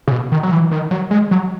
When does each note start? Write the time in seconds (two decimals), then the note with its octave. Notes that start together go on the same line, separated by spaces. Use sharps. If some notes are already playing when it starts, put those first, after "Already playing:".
0.07 C#3
0.11 B2
0.32 D#3
0.43 F#3
0.51 E3
0.71 D#3
0.91 F#3
1.11 G#3
1.31 F#3